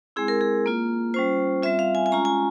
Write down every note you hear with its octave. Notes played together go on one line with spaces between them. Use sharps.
G#3 C4 E4 G#4
A#4
G#4
A#3 F4
G3 C#4 F4 C5
G3 C4 F4 E5
F5
G#5
G#5
G#3 C#4 F4 A#5
G#5